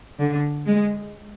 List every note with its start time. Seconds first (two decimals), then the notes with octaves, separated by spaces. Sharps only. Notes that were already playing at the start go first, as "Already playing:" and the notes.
0.21 D3
0.66 G#3